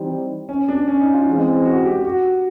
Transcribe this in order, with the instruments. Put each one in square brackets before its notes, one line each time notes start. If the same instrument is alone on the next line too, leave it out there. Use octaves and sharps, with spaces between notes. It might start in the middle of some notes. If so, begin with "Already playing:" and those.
Already playing: [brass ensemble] E3 G3 C4 D#4 G4
[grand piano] C#4
D4
C#4
D#4
F4
[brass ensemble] E3 G#3 C4
[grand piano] F#4
G4
G4
F#4